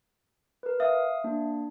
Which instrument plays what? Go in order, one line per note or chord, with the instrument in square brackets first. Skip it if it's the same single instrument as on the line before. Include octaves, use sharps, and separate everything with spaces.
[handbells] A#4 B4
[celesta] E5 [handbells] F5 D#6
[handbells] A#3 D4